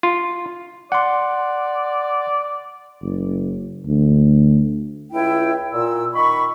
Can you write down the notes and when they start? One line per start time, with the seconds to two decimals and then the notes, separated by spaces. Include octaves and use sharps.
0.03 F4
0.92 D5 F#5 C6
3.02 F#1
3.87 D2
5.12 C#2 E4 G5
5.73 A#2 E6
6.13 D#3 B5 C#6